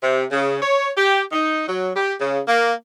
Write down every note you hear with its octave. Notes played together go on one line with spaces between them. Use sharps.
C3
C#3
C#5
G4
D#4
F#3
G4
C#3
A#3